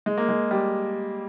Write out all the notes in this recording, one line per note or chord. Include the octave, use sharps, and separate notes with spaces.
G#3
A#3
G#3
G3